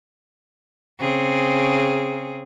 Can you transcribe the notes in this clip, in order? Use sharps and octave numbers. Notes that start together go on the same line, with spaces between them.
C#3 C4 G#4